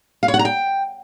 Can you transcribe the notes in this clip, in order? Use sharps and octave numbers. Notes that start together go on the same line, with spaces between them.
F5
C#5
F#5
A#5
G5